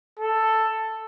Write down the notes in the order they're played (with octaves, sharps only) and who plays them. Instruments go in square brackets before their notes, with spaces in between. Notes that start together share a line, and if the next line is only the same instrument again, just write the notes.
[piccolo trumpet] A4